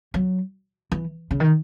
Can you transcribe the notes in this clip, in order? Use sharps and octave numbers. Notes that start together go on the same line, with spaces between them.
F#3
E3
C#3
D#3